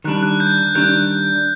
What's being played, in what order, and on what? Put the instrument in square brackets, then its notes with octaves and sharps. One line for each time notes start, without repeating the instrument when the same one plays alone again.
[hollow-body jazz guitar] D#3 G3 D4 [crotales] F#6
[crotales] F#6
G6
G6
[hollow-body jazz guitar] D#3 G3 D4 [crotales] G6